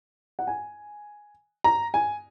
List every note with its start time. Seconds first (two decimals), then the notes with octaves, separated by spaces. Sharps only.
0.39 F#5
0.47 G#5
1.64 A#5
1.94 G#5